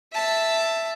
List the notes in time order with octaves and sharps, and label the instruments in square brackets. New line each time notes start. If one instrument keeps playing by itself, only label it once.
[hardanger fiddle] E5 A5